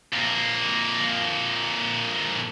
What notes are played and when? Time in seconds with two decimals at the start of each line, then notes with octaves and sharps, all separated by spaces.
0.14 F2 A#3